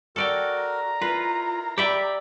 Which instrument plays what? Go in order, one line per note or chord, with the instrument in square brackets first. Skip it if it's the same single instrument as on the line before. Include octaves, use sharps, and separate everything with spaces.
[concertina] F#4 A#4 [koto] A4 D5 G5
[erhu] A#5
[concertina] E4 A#4 [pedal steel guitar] F4 [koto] B4
[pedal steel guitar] G4 B5 [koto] D5 E5 G5